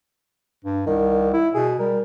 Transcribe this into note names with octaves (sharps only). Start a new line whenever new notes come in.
G2
C2 D#3
E4
B2 G#4
G3 A#4